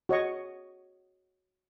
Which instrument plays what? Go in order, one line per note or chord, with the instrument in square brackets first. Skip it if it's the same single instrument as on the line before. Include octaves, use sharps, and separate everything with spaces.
[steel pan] F#4 C#5 D#5 C#6